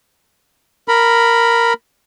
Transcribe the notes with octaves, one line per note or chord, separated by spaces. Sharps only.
A#4 B5